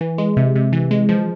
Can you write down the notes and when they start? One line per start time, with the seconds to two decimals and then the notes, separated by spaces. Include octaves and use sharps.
0.01 E3
0.18 G#3
0.37 C3
0.56 C3
0.73 E3
0.91 G#3
1.09 F3